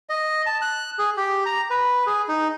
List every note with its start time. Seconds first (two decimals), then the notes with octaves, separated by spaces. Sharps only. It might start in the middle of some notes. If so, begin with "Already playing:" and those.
0.10 D#5
0.46 A5
0.62 F#6
0.99 G#4
1.17 G4
1.46 A#5
1.70 B4
2.07 G#4
2.29 D#4